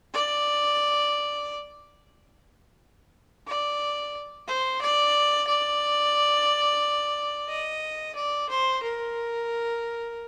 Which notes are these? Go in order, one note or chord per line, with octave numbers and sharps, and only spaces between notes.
D5
D5
C5
D5
D5
D#5
D5
C5
A#4